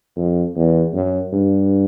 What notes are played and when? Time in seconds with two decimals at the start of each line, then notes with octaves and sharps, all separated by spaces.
0.16 F2
0.55 E2
0.93 F#2
1.33 G2